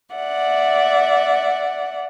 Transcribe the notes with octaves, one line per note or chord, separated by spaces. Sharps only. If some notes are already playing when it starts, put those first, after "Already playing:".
D5 E5 F#5